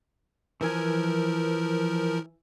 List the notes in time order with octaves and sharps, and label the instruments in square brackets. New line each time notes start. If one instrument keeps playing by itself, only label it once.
[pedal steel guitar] E3 G#5 [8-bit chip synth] F3 A#4